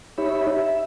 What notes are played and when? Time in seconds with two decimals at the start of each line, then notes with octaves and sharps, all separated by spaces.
0.18 D#4 G4 C#5 E5 B5
0.54 E5